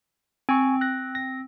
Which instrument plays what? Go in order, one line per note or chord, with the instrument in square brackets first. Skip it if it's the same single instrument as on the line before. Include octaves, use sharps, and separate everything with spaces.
[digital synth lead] C4 [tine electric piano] G#5 C#6
[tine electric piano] F#6 A#6
A#6